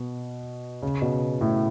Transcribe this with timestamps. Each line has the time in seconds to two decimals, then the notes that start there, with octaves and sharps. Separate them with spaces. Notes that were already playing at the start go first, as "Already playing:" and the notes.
Already playing: B2
0.82 C#3
1.02 B2
1.41 A2